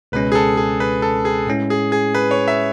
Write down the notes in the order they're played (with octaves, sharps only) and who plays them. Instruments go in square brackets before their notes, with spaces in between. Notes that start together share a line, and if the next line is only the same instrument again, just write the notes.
[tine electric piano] C#2 B2 G#3 C#4 [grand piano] B4
[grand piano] G#4
A4
G#4
B4
A4
G#4
[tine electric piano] A2 G#3 C#4 E4
[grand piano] G#4
G#4
B4
C#5
E5